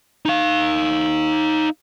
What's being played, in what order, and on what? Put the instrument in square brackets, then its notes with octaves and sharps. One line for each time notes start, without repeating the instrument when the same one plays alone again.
[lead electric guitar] D#4 F5